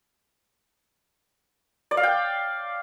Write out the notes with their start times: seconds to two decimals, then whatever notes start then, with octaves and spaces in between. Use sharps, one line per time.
1.91 D5
1.97 F5
2.03 G5